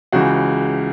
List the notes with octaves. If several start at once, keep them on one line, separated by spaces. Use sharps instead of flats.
C#2 C#3 E3 F#4